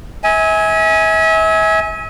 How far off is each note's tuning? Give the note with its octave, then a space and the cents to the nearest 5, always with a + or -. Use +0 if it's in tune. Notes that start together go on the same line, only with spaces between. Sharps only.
E5 -40 G#5 +0